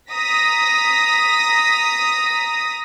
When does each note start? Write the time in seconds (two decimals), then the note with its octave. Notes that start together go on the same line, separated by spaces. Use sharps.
0.12 A#5 D#6 A#6 B6